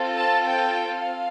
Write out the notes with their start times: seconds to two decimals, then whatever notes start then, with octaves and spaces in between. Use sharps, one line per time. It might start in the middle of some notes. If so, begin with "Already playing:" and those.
Already playing: C4 F4 A4
0.16 A5
0.47 G5
0.93 F5